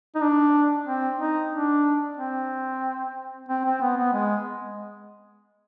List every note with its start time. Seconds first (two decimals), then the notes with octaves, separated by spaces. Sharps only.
0.15 D#4
0.21 D4
0.87 C4
1.19 D#4
1.53 D4
2.17 C4
3.49 C4
3.65 C4
3.81 B3
3.97 B3
4.13 G#3